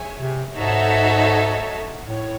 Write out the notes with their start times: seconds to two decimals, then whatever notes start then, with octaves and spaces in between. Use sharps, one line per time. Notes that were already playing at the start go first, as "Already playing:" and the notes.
Already playing: G#4 C#5 E5 G#5
0.19 C3
0.57 G#2 D#4 F#4 A4 C#5 E5
2.07 A2 C#5